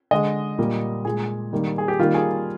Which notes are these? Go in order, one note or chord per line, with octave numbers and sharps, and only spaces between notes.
D3 G#3 D#5
A#2 G3 A#3
A#2 G#3 G#4
D#3 G3 A#3
G#4
G4
D#3 G3 A#3 F4
G#4